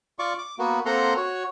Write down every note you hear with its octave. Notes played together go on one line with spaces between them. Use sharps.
F4 D5 C#6 D6
D6
A#3 B3 F#4
A#3 C4 A4 F#5 A#5 C6
F#4 C#5